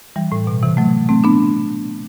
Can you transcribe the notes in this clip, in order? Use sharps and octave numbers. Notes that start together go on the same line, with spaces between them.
E3 G3
A2
B2
C3 E3
F#3 A3
A3 C4
B3 D4